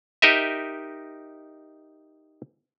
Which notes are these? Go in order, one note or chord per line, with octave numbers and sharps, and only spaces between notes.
D#4 G4 A#4 D#5 E5